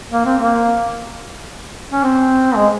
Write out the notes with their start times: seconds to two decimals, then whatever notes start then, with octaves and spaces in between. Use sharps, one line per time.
0.12 A#3
0.25 C4
0.39 A#3
1.92 C#4
2.03 C4
2.56 G#3